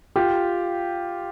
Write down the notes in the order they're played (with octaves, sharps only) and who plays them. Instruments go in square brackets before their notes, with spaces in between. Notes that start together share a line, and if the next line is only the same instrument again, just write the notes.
[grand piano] F4 G4